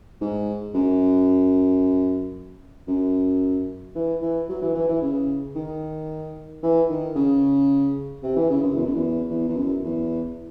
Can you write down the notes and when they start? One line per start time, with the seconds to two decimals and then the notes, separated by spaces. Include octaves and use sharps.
0.21 G#2
0.74 F#2
2.88 F#2
3.95 E3
4.22 E3
4.49 F#3
4.62 E3
4.75 E3
4.88 E3
5.02 C#3
5.55 D#3
6.63 E3
6.90 D#3
7.15 C#3
8.23 C3
8.36 E3
8.50 C#3
8.62 F#2
8.76 E2
8.85 F#2
8.94 E2
9.30 E2
9.48 E2
9.56 F#2
9.83 E2